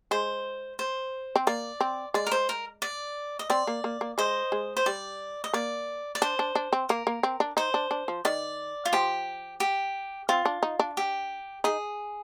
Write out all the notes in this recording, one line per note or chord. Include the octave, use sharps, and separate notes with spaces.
G#3 C5
C5
C4
A#3 D5
C4
G#3 D5
A#4
C5
A#4
D5
D#5
C4 D5
A#3
A#3
A#3
G#3 C5 D#5
G#3
C5
G3 D5
D#5
A#3 D5
D5
D4 C5
D4
D4
C4
A#3 A#4
A#3
C4
D4
D#4 C5
D4
D4
F3
D#3 D5
F4
F3 G4
G4
C4 F4
D4
D#4
D4
G4
D#4 G#4